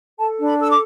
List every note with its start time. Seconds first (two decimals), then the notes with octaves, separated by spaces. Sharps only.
0.20 A4 A5
0.39 D4
0.45 B5
0.58 A4 E6
0.70 D6